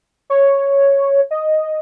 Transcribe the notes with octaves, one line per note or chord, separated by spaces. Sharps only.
C#5
D#5